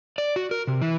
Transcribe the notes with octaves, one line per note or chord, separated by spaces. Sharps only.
D5
F#4
A#4
C3
E3